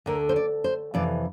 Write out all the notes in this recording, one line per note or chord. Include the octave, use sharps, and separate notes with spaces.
D2 D3 A#4
C5
D5
C5
F2 C3 E3 D5